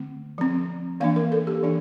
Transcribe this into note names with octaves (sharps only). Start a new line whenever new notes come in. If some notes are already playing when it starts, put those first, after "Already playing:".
Already playing: D3 A3 C4
F3 C4
E3 A#3 D4 F5
A#4
A4
G4
E3 A#3 D4